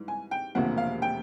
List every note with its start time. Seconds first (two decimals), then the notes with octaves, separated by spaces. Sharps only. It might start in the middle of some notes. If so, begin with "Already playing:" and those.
Already playing: G#2 E3 G3
0.08 G#5
0.31 G5
0.55 E1 D2 C3 F3 A#3 F#5
0.78 F5
1.02 G5